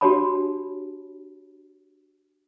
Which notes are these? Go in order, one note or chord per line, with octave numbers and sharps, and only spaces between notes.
D4 F#4 G4 C#5 A5 B5